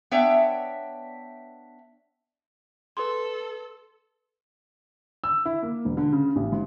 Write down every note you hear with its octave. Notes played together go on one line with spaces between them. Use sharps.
B3 D4 C#5 D5 E5 G5
A4 B4 C6
E6
E4
A#3
E1
D3
C#3
A1
G#2